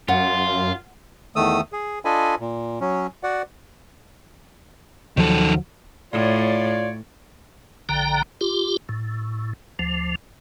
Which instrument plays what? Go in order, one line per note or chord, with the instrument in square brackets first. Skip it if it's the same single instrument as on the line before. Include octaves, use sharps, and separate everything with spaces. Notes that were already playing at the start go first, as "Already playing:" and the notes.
[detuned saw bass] F#2 [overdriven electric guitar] F4 [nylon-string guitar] F#5
[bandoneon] E2 D#3 A3 D#6 E6
G#4
D4 F4 A4 D#5 G#5 B5
A#2
F#3 C#4
F#4 D5 F#5
[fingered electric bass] D#2 F3 F#3 [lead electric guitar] D#3 A4
[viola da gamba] A2 [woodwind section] F4 C#5 D5
[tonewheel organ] A#1 D3 G5 A#5
F4 G4
A2
D2 F3